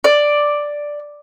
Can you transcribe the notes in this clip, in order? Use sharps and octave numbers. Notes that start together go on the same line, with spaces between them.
D5